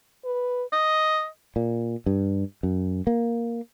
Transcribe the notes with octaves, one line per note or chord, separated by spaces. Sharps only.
B4
D#5
A#2
G2
F#2
A#3